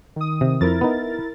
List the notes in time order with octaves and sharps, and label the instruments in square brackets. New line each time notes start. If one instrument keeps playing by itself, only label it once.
[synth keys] D#3 D#6
[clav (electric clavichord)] C3
[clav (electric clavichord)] F2 [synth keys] E4 A#4 A6
[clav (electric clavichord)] B3 D#4